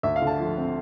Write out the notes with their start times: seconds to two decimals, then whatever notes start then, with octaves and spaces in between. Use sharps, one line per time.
0.03 D2 E5
0.16 F5
0.22 D3 A5
0.39 F3
0.57 C4